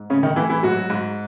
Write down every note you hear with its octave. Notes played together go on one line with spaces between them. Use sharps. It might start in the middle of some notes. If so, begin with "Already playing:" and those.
Already playing: G#2
A2 C#3 C#4
D#3 D#4
A2 E3 E4
E3 E4
G#2 F#3 F#4
G#2